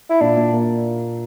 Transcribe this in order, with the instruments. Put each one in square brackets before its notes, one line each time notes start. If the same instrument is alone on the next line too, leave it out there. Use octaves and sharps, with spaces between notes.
[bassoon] E4
[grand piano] A#2 [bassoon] D4
[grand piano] A#2
A#3